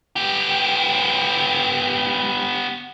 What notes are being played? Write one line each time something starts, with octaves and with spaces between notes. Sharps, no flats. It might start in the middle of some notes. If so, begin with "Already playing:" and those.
B3 G4